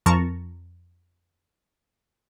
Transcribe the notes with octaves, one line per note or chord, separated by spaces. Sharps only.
F2 F3 A#4 A5 A#5 C#6